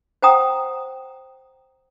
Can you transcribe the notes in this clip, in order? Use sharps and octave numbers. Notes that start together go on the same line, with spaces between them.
C5 F#5 G5 A#5 D#6